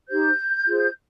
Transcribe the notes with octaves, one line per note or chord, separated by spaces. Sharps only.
D#4 G4 C5 G6
F4 G#4 C5